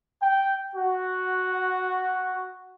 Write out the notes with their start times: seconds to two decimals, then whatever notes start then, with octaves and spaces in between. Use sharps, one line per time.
0.23 G5
0.76 F#4